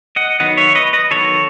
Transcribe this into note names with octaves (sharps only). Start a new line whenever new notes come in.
D#5 F#5
D#3 F#3 B3 D#5 F#5
C#5 E5
B4 D#5
B4 D#5
D#3 F#3 B3 A4 C#5